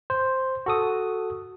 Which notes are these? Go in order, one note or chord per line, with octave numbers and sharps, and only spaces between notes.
C5
F#4 A4 D#6